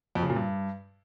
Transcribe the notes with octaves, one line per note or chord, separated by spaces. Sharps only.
F2
C#3
A#2
G2